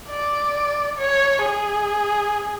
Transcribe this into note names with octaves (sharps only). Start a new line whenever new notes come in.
D5
C#5
G#4